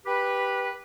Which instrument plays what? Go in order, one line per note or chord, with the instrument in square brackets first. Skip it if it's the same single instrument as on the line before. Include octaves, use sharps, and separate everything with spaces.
[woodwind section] G4 B4